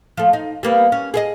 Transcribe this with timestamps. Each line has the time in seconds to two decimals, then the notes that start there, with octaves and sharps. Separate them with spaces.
0.17 F3 A3
0.33 D#4
0.63 G3 A#3 B3
0.92 C#4
1.14 G#4 A4 D#5